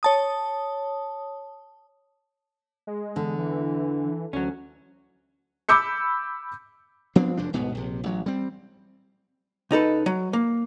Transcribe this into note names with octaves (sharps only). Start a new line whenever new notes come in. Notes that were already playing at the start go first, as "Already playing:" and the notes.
C#5 A5 D#6
G#3
E2 D3
E3
D2 F#3 C#4
B5 D6 E6 G6 C#7
F3 B3 C4 D4
F1 F#2 F3 D4
D1 G#2 B2 B3
A#1 C3
A1 F#3
G3 C4
C#2 D#4 A4 B4
F#3
A#3